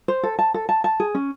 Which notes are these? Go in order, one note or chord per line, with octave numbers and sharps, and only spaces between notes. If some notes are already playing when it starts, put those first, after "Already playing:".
C5
A4
A5
A4
A5
A5
G#4
C#4